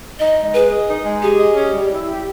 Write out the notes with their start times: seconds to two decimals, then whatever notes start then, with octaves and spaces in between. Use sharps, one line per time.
0.19 D#4 D#5
0.36 G#3
0.54 G#4 B4
0.70 D#5
0.88 D#4
1.04 G#3
1.22 G4 G#4
1.40 D#5
1.55 C#4
1.74 G3
1.91 E4
2.07 G4